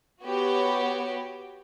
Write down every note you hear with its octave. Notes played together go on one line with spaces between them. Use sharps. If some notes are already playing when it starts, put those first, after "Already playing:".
B3 F#4 G4 C#5